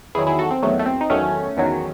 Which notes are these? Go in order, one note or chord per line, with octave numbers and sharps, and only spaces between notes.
E2 D#3 F#3 E4 G#4
E4 G#4
F#4 A4
C4
E2 D#3 F#3 A3
A3
C4
D#4
E2 D#3 F#3 A3 C#4
E2 D#3 F#3